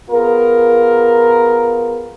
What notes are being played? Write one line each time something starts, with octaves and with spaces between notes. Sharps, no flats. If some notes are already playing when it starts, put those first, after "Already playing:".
B3 F4 G#4 A#4